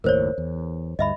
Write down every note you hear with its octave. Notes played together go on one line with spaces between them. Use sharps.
F#1 D#2 A2 A#4 C5 C#5
E2
D2 G2 D#5 E5 B5